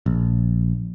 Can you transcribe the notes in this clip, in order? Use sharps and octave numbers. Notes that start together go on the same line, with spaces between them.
A#1